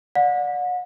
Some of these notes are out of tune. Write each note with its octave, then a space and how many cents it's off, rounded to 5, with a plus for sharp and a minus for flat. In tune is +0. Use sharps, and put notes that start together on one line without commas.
D5 +0 F#5 -40